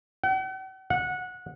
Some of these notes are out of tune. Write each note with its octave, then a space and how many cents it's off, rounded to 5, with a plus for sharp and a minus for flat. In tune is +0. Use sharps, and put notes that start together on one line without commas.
F#5 +45
F#5 -20